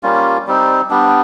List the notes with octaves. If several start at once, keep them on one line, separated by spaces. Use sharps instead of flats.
G3 A#3 C#4 F4
G3 C4 D#4
G3 B3 D4